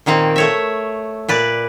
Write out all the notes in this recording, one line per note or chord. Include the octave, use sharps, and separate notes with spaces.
A#2 D#3 A#3 C4
A3 C#5 E5
A#2 B4 D5